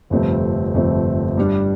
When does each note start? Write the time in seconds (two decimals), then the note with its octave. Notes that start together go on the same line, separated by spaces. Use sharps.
0.10 G1 F2 C3 A3 C4
0.74 G1 F2 C3 A3 C4
1.37 G2 G3 D4